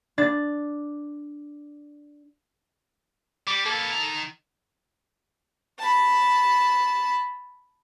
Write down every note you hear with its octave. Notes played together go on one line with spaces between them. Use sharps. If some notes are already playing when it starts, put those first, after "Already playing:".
D4 A6
G3 D6
A#3 B3 A4
D#3 A#5
A5 B5